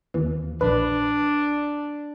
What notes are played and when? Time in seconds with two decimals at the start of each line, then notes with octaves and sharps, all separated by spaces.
0.14 D#2 E3
0.61 A#1 D4 B4